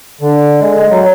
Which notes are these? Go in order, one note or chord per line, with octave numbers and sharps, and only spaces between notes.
D3
G#3
F#3